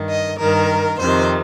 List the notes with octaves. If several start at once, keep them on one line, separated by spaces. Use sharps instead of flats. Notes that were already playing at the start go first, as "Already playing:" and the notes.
Already playing: G2 D#3
D#5
G2 D#3 A#4
F2 C3 D#3 C5